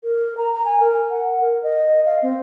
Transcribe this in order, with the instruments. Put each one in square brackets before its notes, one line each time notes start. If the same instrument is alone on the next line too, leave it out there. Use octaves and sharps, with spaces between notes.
[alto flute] A#4
A#5
A#5
G#5
A#4
F#5
A#4
D#5
F5
C4